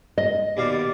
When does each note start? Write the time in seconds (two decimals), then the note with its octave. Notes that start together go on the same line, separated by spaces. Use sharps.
0.18 D#5
0.57 D#2 B2 D5 F5